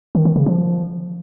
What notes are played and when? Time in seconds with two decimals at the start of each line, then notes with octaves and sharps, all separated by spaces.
0.15 D#3
0.25 D#3
0.36 C#3
0.46 F3